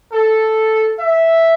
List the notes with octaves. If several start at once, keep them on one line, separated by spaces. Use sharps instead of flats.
A4
E5